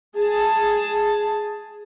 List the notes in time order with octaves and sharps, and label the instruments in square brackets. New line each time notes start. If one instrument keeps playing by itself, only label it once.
[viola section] G#4 A5